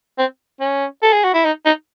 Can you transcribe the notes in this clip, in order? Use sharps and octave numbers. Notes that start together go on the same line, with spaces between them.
C4
C#4
A4
G#4
F#4
E4
D#4
D#4